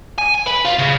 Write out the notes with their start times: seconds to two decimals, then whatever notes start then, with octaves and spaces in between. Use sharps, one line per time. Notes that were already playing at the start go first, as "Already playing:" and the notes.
0.18 G#5
0.34 G#5
0.46 B4
0.65 F4
0.79 C#3